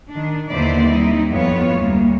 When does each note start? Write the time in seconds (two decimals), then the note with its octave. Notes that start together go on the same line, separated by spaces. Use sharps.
0.10 D#3 D4
0.50 D#2 D3 B3 E4 C5 D5
0.88 G3 C4 D#4 E4
1.29 F2 B3 F4 C#5
1.72 D2 G3 A#3